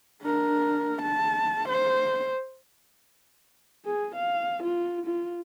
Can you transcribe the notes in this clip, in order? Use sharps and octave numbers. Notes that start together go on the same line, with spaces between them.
D4 A#4
A5
C5
G#4
F5
F4
F4